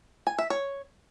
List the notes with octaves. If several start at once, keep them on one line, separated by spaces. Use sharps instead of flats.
G#5
E5
C#5